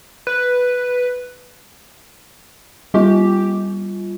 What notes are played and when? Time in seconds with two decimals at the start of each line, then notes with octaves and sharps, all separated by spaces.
0.27 B4
2.94 G3 C4 F4 G4